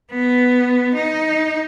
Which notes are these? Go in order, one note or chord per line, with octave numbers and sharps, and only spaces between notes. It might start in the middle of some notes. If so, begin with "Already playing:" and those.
B3
D#4